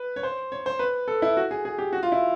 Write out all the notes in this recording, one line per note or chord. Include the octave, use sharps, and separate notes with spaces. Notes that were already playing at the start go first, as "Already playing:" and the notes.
Already playing: B4
C#5
C5
C#5
C5
B4
A4
E4
F#4
G#4
G#4
G4
F#4
F4
E4